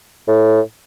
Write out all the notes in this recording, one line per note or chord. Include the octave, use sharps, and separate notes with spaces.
A2